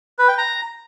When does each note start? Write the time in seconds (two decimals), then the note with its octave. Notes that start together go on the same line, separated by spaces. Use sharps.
0.19 B4
0.28 G5
0.38 A#5